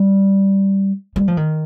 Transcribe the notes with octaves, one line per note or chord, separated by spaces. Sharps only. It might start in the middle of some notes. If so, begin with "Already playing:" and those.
Already playing: G3
G3
F3
D#3